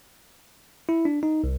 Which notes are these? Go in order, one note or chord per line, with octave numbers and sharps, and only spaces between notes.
E4
D4
D#4
C2